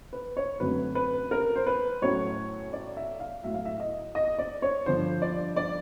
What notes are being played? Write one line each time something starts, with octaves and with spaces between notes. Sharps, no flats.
B4
C#5
F#2 D3 F#3 A3 C4 B4
B4
A#4
C5
B4
A2 F#3 A3 C#4 C#5
D5
E5
F5
A2 F#3 A3 E5
F5
E5
D#5
D#5
D5
C#5
G2 D3 F3 C5
D5
D5